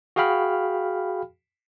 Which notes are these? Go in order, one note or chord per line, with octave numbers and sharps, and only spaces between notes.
F#4 G#4 F5 G5 B5 F6